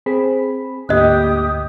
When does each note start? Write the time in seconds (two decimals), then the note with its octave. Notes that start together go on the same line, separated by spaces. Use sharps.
0.06 C4 G#4 B5
0.89 D2 G#2 A#3 G4 D#5 D#6 F#6